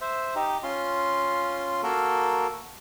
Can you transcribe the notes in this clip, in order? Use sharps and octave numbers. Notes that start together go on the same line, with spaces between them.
C5 E5
D#4 G4
C#4 F4 C6
A#3 F#4 A4 A#4